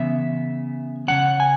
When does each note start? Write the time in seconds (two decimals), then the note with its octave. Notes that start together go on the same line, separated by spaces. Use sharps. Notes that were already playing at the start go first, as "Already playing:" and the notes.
Already playing: C#3 E3 B3 E5
1.08 C#3 E3 C#4 F#5
1.40 G#5